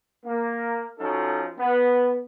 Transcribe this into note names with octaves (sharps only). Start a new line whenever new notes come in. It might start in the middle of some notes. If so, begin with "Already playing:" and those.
A#3
F3 C#4 D#4 F#4 A4
B3